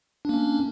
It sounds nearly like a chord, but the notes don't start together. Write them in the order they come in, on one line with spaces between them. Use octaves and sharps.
D4 A#3 C#4